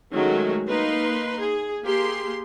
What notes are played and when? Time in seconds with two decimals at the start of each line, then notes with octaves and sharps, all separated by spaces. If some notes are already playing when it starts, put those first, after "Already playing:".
0.12 D#3 F#3 G#3 A3 C#4 F#4
0.67 A#3 D#4 B4 C6
1.41 G#4
1.83 A#3 G4 G#4 C6